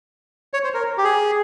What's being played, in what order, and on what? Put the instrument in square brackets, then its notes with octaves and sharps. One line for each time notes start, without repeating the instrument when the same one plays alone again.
[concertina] C#5
C5
A#4
G4
G#4